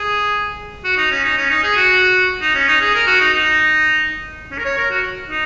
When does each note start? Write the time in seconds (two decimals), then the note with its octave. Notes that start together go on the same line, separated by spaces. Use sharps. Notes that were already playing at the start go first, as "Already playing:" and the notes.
Already playing: G#4
0.84 F#4
0.97 D#4
1.11 C#4
1.24 D#4
1.37 C#4
1.50 D#4
1.63 G#4
1.77 F#4
2.41 D#4
2.55 C#4
2.68 D#4
2.81 G#4
2.94 A#4
3.07 F#4
3.21 D#4
3.34 D#4
4.51 C#4
4.58 A#4
4.65 C#5
4.78 A#4
4.91 F#4
5.30 D#4